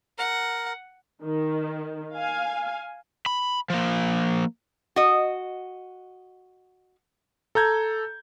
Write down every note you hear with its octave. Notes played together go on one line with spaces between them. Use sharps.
A#4 F#5
D#3
F5 G#5
B5
F3 A#3
F#4 D#5
A4 A#5 G6 G#6